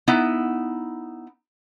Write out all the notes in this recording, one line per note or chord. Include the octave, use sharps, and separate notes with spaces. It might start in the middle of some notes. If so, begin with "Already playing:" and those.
B3 D#4 E4